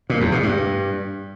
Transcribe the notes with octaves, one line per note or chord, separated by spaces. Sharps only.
A#2
E2
B2
G2